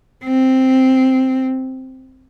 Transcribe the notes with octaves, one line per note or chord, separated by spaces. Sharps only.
C4